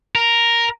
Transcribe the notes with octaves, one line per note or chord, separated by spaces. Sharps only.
A#4